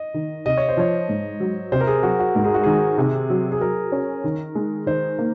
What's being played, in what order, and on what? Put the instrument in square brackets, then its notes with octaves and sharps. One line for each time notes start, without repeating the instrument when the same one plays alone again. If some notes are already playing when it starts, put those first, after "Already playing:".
Already playing: [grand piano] D#5
[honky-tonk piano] D#3
[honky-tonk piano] C3 [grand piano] D#5
[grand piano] C#5
C5
[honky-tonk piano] F3 [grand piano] C#5
[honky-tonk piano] G#2
F#3
[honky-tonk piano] C3 [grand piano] C5
[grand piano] A#4
G#4
[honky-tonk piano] F#3 [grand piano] F#4
[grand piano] F#4
[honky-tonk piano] G#2 [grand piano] A#4
[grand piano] G#4
F#4
[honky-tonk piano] D#3 [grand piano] G#4
[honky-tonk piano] C3
F#3
[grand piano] G#4
[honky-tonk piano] F#3 [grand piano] A#4
[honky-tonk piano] C#4
D#3
G#3
[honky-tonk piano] D#3 [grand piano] C5
[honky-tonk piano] A#3